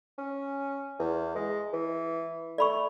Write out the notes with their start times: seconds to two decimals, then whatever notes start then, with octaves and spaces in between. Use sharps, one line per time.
0.18 C#4
0.99 E2
1.35 G#3
1.73 E3
2.58 A3 D5 B5 C#6